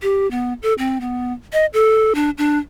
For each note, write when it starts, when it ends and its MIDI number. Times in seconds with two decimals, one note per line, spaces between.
0.02 0.29 67
0.31 0.53 59
0.63 0.74 69
0.78 1.01 60
1.01 1.33 59
1.53 1.66 75
1.74 2.13 69
2.15 2.30 62
2.38 2.59 62